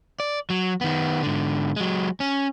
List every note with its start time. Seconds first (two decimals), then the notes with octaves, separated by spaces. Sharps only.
0.20 D5
0.50 F#3
0.81 D#3 B3
1.23 G#2 D3
1.76 F#3 G#3
2.20 C#4